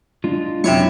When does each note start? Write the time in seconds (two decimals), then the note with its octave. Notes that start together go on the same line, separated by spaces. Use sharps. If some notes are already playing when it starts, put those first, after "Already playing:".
0.24 G#3 D4 F4
0.64 F#2 C3 E4 C#5 C#6